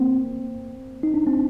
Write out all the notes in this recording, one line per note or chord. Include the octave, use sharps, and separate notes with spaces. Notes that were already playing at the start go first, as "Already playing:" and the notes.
Already playing: A#3 C4
D#4
D4
C4